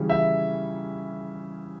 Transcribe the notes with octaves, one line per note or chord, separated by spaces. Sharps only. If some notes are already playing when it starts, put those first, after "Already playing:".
Already playing: C#3 E3 G3 C#4
E5